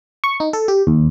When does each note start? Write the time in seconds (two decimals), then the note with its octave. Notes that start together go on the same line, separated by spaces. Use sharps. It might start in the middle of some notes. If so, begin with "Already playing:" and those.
0.24 C#6
0.40 D#4
0.53 A4
0.68 G4
0.87 D#2